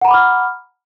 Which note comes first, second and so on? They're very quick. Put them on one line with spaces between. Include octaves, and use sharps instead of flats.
F#5 A#5 B5 D6 F6